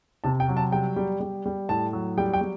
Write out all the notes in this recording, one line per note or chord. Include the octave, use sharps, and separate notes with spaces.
C3 A5
G5
F#3
A5
G3 G5
G3
G3
G3
A2 A5
F#3
G3 G5
G5
G3